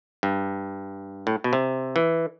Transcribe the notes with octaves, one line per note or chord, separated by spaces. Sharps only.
G2
A2
B2
C3
E3